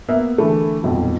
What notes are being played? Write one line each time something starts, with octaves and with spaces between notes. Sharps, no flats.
A#3 B3 E5
D3 E3 A3
D#1 B1 F2